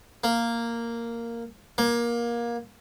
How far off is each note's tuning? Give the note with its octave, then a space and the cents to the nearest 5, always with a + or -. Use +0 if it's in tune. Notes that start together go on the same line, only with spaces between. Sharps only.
A#3 -5
A#3 +20